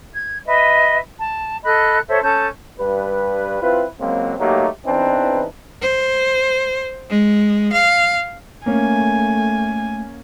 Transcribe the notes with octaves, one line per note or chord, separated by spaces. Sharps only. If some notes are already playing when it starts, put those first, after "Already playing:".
G#6
B4 D#5 E5
A5
A4 D#5 B5 F#6
A4 C5 C#5 E5
C#4 A4 A5 G6
G2 B4
C4 E4 F4 B4
C#2 F#3 A#3 C4
F#3 A3 A#3 D#4 G4
E2 E3 C4 D4 D#4 B4
C5
G#3
F5
A3 A#3 C#4 G#5